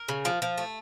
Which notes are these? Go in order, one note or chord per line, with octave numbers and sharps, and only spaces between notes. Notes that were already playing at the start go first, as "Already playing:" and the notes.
Already playing: A#4
C#3
F3
F3
A3